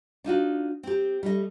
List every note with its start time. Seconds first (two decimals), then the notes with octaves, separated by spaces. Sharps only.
0.24 D4 D#4 F4 F#4
0.83 C4 G4
1.23 G3 A3 D#5